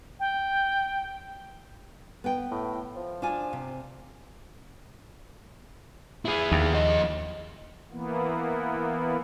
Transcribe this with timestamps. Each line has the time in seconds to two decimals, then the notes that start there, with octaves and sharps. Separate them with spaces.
0.20 G5
2.24 B3 G5
2.51 A2
2.96 F3
3.22 D4 F4 G#5
3.53 C3
6.25 E4 G#4
6.52 D#2
6.74 F3 D#5
7.91 E3 A#3 B3